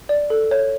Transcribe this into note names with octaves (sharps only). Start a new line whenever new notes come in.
D5
A4
C#5